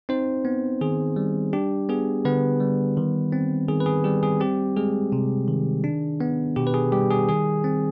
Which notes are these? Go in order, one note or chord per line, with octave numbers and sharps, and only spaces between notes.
C4 D#4 C5
B3
D#3 G#4
G3
D4 G4
B3 G#4
D3 B3 B4
G3
D#3
C4
D#3 G#4
B4
G#4
G3 G4
G#4
C4 G4
G#3 G#4
C3
D#3
D4
B3
B2 G4
B4
G#4
G3 G4
G#4
D#3 G#4
C4